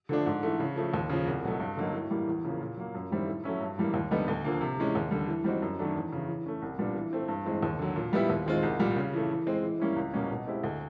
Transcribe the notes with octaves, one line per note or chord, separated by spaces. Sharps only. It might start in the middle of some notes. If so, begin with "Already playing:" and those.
D3 F3 A3 D4
G#2
E3 A3
C#3
F3 A3
D#2
C#3 F3
C2
B2 F#3 A3
G2
D3 F#3 A#3 D#4
A2
E3 G3 A#3
E2
C#3 F3 A#3
A#2
F#3 A#3
F#2
D#3 G3 C4 E4
A2
F#3 A3 C#4 E4
G2
E3 G3 A#3
D#2
D3 G3 B3 D#4
D2
D3 F3 A#3
C3
E3 G#3 C#4
D#2
D3 G3
E3
G3 C4 D#4 F#4
F#2
D#3 F#3 A3 D4
E2
C#3 E3
E3
A3 C#4
C2
A#2 G3 B3 D4
E3
A3 C4
G2
E3 G#3 C4
D#2
D3 F#3
A#2
G3 B3 E4 G4
D#2
D#3 G#3 C4 F4
C2
A#2 G3
C#3
E3 A3
E3
G#3 C4
E3
G3 A#3 C#4 E4
C#2
B2 G3 A#3 C#4
B2
G#3 C4 E4 G4
D2